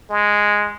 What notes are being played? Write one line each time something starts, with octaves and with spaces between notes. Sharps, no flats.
G#3